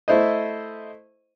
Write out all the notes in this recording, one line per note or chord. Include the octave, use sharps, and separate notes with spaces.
A3 E4 C5 D#5